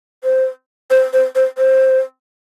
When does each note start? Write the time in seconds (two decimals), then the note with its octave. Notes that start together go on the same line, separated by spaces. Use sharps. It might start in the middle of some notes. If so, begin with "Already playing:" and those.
0.24 C5
0.90 C5
1.13 C5
1.35 C5
1.58 C5